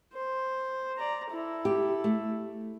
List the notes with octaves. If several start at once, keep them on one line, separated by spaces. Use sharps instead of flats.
C5
D5 A#5
E4 A4
G4
A3